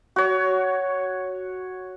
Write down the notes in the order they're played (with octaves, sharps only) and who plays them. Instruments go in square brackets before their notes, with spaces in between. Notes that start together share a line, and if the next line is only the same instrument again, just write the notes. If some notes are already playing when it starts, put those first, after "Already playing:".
[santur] F#4 C#5